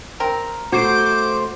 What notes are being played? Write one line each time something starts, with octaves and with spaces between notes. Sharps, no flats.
C4 A#4
A3 F#4 C5 D6